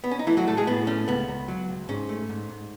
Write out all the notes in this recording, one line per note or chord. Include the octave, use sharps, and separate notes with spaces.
B3
C#4
D#4
E3 A3 E4
F#3 F#4
A2 A3 A4
G#3 G#4
A2 B3
A3 C#4
C#2 B3
C#2
F#3
C#2
G#2 C#4
A3
G#2
G#2